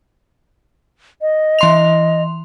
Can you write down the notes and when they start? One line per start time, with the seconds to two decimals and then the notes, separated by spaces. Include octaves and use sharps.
1.21 D#5
1.59 E3 C6 F7